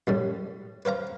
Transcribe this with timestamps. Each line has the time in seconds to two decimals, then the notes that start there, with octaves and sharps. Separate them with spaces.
0.07 F#2 A2 G3
0.85 B4 C5 F5 A#5